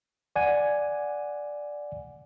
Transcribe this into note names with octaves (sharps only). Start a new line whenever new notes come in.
D5 F#5 G#5